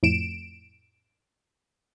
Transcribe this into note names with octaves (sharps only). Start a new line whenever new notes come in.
F2 A2 D7 E7